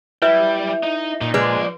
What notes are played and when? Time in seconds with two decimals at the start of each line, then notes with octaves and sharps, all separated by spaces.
0.22 G3 E4 B4 E5 G5
0.83 D#4
1.21 A#2 D#4
1.34 F3 G#3 B4 D5